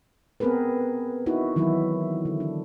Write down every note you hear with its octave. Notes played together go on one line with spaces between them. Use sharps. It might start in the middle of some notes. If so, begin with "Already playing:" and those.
B3 C4 G#4 A#4 B4
D#4 E4 F#4 B4
D#3 E3 F#3 E4
D3
D4